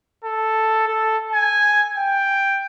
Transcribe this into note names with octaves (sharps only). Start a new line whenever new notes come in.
A4
A4
G#5
G5